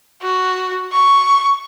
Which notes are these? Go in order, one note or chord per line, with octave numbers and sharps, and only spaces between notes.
F#4
C#6